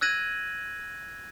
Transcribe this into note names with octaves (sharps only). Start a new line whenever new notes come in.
E6 F#6 G#6 A#6 D#7 F#7